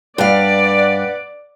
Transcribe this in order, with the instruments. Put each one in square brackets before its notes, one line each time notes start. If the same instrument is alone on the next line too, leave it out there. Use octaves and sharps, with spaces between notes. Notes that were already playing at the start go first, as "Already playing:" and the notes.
[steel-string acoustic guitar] G2 F5 [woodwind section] B4 F#5 [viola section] D5